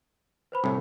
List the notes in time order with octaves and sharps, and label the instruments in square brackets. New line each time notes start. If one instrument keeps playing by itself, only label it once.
[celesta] B4 C5 B5
[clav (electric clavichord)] C2 A2